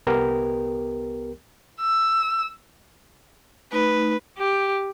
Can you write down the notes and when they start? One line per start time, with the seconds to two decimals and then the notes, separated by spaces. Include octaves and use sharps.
0.07 C2 B3 G4 A#4 G5
1.80 E6
3.72 A3 D#4 B4
4.38 G4